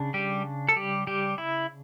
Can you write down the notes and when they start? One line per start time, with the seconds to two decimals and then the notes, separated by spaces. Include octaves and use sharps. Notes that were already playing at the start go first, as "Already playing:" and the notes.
Already playing: C#3 D4
0.14 G3 G4
0.69 A4
0.76 G3 G4
1.07 G3 G4
1.38 E4